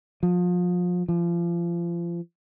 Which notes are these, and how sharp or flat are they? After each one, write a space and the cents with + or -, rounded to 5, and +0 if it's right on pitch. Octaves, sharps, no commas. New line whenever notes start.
F3 +30
F3 -30